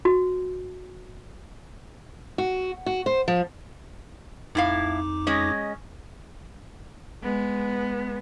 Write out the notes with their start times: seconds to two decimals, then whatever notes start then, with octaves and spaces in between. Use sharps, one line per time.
0.05 F#4
2.38 F#4
2.86 F#4
3.06 C5
3.28 F3
4.55 F2 A2 D#4 E4 F5 D6
5.27 G#3 C#4 D#5
7.22 G#3 B3